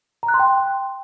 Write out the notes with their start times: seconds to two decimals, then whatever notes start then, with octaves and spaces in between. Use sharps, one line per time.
0.23 A#5
0.28 F#6
0.34 C6
0.39 G5